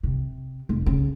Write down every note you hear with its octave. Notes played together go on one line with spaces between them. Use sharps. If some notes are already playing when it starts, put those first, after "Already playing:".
C3
F1
C#3